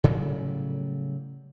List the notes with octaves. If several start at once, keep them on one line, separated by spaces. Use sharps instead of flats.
A2 C#3 F#3 G3